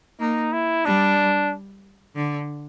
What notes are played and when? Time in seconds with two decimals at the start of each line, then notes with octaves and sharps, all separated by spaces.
0.20 A#3 D#4
0.53 E4
0.85 G3 D4
2.16 D3